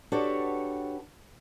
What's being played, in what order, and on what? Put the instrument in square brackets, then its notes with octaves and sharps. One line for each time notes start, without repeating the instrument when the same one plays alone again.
[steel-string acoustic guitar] D4 F#4 G4 A4 B4 C#5